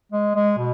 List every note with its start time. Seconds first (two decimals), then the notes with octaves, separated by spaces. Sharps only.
0.12 G#3
0.35 G#3
0.58 B2